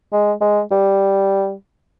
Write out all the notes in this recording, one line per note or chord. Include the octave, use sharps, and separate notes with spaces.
G#3
G#3
G3